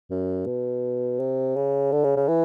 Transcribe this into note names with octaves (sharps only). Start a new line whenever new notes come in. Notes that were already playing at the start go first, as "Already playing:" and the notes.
F#2
B2
C3
C#3
D3
C#3
C#3
E3